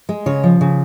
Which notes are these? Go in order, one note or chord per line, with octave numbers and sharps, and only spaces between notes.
G#3
C#3 C#5
F3
C#3